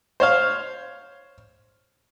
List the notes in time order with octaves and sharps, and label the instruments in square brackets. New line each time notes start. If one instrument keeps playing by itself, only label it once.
[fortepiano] C5 C#5 F5